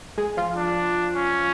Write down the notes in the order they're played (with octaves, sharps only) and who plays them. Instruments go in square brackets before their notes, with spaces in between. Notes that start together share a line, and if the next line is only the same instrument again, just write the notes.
[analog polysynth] G#3 G#4
F3 F4
[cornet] D4
C#4